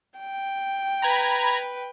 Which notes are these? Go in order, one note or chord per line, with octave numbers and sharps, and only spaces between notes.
G5
B4 A#5 B5 G#6